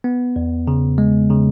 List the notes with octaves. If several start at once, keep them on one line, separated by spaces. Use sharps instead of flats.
B3
E2
C#3
G#3
C#3